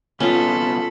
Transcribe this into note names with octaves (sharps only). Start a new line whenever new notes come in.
C2 B3 C#4 F4 A4 B5